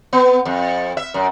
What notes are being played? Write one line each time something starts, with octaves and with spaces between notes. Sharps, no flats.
B3
F2
E5
F#2